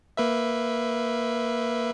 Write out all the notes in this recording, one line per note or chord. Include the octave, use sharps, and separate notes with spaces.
A#3 B4 E5